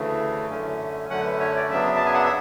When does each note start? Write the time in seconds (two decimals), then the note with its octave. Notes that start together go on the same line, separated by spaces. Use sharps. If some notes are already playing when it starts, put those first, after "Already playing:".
Already playing: D2 C#3 E3 A3
0.49 F#2 D3 A3 C#4
1.10 F#2 D3 A3 C#4 F#5
1.25 B4
1.40 C#5
1.56 D5
1.71 F#2 C#3 F#3 B3 D4 E5
1.97 A5
2.06 G#5
2.14 F#5
2.23 E5